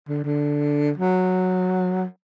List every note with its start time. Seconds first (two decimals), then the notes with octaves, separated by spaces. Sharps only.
0.09 D3
0.24 D3
0.98 F#3